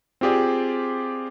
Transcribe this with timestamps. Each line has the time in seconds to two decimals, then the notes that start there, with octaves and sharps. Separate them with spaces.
0.21 C4 F4 G4 G#4 D5